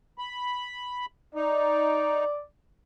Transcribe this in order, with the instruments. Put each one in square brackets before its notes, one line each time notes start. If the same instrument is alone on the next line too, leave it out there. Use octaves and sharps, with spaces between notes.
[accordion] B5
[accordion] D#4 [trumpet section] D5